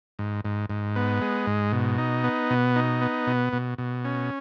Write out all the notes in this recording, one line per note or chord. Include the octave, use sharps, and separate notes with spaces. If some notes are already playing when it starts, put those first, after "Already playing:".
G#2
G#2
G#2
B3
G#3
G#2
B2
D#4
B3
B2
D#4
B3
B2
B2
B2
C#4